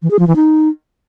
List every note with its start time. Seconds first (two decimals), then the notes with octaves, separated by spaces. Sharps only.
0.02 E3
0.11 G#4
0.19 F3
0.27 E3
0.36 D#4